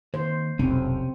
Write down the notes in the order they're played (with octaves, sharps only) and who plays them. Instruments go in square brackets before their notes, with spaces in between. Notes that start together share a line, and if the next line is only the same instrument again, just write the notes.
[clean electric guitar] D#2 [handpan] C5
[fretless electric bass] D#1 B1 F2 [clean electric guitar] C3 C#4 [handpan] C4